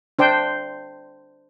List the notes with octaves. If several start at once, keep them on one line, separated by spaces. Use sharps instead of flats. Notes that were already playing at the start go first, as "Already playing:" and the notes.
D4 C5 G5